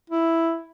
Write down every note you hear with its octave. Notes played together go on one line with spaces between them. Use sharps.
E4